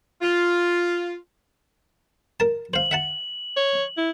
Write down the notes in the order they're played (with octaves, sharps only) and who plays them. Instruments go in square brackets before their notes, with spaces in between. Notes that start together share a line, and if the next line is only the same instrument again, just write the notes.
[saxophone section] F4
[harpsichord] A#4 A5
[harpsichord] C5 F5 [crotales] F#7
[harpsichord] E5 F#5 A5
[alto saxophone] C#5
E4